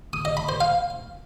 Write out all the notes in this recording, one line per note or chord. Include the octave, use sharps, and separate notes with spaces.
D#6
D#5
B5
C5
F5